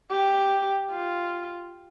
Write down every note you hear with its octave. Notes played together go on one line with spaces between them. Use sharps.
G4
F4